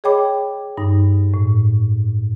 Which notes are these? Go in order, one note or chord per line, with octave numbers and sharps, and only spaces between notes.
G#4 C#5 D#5 G5 B5 D6
G2 D#4
A2